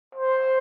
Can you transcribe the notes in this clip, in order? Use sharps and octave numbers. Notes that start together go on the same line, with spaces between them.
C5